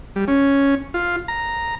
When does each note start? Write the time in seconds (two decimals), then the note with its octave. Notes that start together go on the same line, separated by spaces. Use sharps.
0.16 G3
0.28 C#4
0.94 F4
1.28 A#5